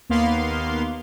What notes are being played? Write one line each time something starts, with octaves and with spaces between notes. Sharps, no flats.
D#2 A#3 B3 F5 C6